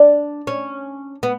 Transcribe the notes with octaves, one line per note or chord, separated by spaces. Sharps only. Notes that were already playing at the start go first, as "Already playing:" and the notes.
Already playing: D4
C#4
B3